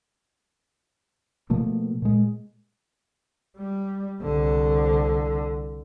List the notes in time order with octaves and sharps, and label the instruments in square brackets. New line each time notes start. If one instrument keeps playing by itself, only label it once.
[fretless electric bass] B2 F3 A3 A#3
A#2 G#3
[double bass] G3
C2 D3